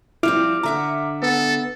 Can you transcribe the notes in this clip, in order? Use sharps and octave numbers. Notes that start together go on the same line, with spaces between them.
F3 G3 C4 E4 D6 F6
D3 E5 F#5 A#5
B3 A4